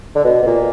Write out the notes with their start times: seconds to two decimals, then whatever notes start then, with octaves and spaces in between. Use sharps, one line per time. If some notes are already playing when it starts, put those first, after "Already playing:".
0.15 D3
0.24 B2
0.42 B2
0.47 A#2